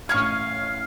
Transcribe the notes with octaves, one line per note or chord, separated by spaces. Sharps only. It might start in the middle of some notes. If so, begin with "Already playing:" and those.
A1 C#4 C#5 D#5 F5 F6 G#6